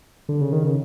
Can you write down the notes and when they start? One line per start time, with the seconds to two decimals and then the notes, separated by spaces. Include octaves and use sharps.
0.29 D3
0.41 C#3
0.53 D#3
0.64 C#3